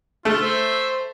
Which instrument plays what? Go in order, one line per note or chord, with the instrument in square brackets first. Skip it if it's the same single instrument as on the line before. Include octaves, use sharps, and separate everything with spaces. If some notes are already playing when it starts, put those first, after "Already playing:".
[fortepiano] A3 [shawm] F4
[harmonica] C5 [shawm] E5